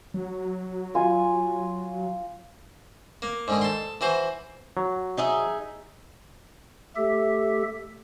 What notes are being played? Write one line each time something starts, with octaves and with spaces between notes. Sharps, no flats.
F#3
F4 G#5
A#3
G#2 D3 D#3
A4 C6
E3 F#4 C5
F#3
D#4 G#4 E5
A3 G4 A4 E5